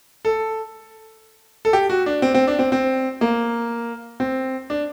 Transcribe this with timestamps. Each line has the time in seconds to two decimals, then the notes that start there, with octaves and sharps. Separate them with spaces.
0.25 A4
1.65 A4
1.73 G4
1.90 F#4
2.06 D4
2.22 C4
2.34 C4
2.47 D4
2.59 C4
2.72 C4
3.21 A#3
4.20 C4
4.70 D4